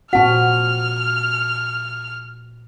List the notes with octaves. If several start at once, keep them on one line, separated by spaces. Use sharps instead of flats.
A#2 C4 F#4 F#5 A5 F6